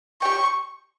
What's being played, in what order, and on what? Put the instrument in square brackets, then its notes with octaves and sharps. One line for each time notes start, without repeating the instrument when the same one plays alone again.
[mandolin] G4 C#5 G5 [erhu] C#6